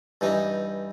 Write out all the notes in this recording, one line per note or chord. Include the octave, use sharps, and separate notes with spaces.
G2 E3 D#4